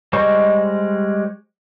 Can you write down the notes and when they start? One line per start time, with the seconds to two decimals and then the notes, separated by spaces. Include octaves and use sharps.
0.13 G3 G#3 C5 D#5 C#6